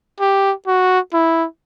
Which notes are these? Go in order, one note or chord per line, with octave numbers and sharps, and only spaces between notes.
G4
F#4
E4